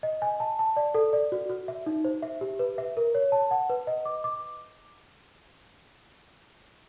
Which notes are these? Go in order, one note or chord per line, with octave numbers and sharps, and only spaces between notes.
D#5
G#5
A5
A5
D5
A4
D5
F#4
F#4
E5
D#4
C5
E5
G4
B4
E5
A#4
C#5
A5
F#5
B4
D#5
D6
D6